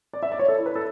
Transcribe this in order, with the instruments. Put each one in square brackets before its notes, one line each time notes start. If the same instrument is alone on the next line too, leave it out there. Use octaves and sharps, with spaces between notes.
[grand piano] D5
E5
D5
C#5
A4
E4
B4
A4